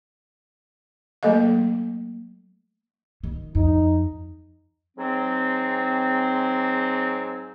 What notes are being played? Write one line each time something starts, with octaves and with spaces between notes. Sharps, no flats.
F#3 A3 A#3 A4 D#5 F5
D#3
F2 D#4
G#2 F#3 C4